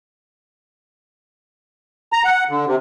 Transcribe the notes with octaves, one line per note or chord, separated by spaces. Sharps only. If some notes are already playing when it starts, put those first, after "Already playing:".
A#5
F#5
D3
C3